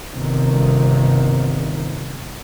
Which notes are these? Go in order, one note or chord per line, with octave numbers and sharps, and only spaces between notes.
G1 C3 D#3